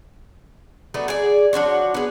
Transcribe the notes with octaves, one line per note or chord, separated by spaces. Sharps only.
F#3 A3 B3 D4
G#4 D5
F3 D4 F#4 C#5
B3 G#4